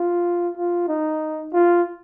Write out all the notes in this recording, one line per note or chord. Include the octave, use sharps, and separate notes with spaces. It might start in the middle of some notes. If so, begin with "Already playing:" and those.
Already playing: F4
F4
D#4
F4